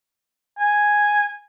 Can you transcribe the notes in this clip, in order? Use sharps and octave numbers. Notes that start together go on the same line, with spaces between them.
G#5